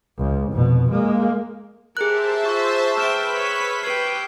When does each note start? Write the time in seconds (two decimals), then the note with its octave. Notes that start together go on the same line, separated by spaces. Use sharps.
0.18 C#2
0.52 F1 B2
0.90 G#3 A#3
1.97 G4 G#4 A#4 C5 E5 A5 F#6
2.45 F4 C#6 E6
2.98 B4 E5 G5 F6 B6 E7 G7
3.36 C#5
3.83 G4 B4 G5 G#6 C7